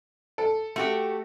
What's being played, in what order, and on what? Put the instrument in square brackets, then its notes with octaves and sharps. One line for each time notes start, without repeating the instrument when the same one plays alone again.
[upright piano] A4
[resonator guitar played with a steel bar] A3 F#4 G4